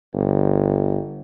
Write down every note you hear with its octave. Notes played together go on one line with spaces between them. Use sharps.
G1